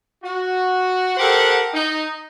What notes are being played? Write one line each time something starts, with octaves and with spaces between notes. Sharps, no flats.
F#4
G4 A4 A#4 C5 F#5
D#4